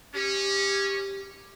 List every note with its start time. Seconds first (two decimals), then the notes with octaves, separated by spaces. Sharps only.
0.14 C#4 G4